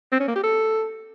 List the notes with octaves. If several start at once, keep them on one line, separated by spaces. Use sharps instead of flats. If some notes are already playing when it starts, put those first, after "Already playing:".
C4
C#4
A#3
G4
A4